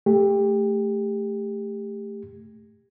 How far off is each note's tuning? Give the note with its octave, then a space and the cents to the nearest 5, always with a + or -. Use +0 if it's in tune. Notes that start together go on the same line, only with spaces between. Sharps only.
A3 +0 G4 +25